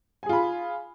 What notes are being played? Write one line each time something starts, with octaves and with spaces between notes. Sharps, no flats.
F4 G#4 G#5 B5